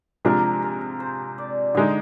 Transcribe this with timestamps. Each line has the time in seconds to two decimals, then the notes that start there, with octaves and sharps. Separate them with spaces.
0.25 C3 F3 G#3 D4 A#4
0.62 A#4
1.00 C5
1.38 D5
1.75 D3 G#3 D#4 D#5